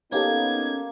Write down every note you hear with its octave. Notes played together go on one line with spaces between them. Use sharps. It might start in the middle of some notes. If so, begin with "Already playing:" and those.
A#3 B3 C#4 D#4 G4 A4 G#6